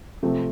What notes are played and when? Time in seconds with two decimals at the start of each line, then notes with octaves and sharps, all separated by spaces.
0.23 C3 F3 A3 C4